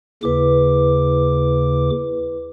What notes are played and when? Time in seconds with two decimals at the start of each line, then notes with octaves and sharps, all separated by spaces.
0.23 D#2 C#3 E4 B4 D6